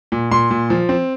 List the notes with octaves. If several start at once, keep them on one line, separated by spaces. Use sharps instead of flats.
A#2
A#2 C6
A#2
F3
C4